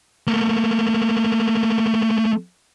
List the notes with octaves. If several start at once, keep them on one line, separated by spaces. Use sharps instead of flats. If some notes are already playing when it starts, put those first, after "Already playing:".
A3 A#3